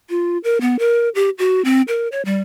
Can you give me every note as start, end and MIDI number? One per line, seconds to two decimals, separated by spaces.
0.09 0.38 65
0.44 0.61 70
0.61 0.78 59
0.79 1.09 70
1.15 1.30 67
1.38 1.64 66
1.65 1.82 60
1.88 2.08 70
2.12 2.22 73
2.25 2.41 55